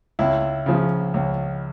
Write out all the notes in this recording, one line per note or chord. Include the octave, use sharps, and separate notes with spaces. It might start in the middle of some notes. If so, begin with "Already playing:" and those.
C#2 E4
C#3 F3
C#2